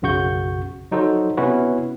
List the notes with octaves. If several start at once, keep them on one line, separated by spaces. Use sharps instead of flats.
B1 F#2 C#3 F#4 C#6 G6
F#3 D#4 F#4 A4 C5
C3 B3 C#4 E4 F#4 B4